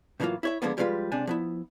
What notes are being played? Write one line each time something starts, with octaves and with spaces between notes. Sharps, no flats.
A2 D3 E3 F#3 A#3 F4
E4 C#5 E5
D3 F3 G#3 A#3 B3
F3 G3 G#3 C#4 F4 B4
C#2 C3 D4 G#5
F3 B3 E4